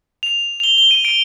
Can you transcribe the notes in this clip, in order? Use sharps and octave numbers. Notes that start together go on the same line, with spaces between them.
F7
F7
G7
G7
D#7
D7